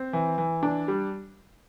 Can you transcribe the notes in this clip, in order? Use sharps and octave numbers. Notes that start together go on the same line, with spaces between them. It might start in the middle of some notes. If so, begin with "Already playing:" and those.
Already playing: C4
E3
E3
D4
G3